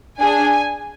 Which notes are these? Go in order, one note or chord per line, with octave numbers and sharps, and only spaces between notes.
D4 G#4 G#5